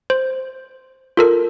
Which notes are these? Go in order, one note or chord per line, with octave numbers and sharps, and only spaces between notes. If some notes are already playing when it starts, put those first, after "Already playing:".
C5
F4 A4 A#4